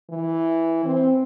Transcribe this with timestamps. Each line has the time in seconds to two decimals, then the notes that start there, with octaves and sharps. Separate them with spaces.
0.10 E3
0.85 C4